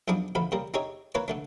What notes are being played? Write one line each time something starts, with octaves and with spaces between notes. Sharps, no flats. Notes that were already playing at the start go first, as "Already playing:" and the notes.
B1 F3 D4 E4 G#4 D6
A1 D3 F3 B5
C#3 G3 A#3
D#4 G4 G#4 C#5 E5
A#3 E4 B4 C#5 G#5
D3 A3 D4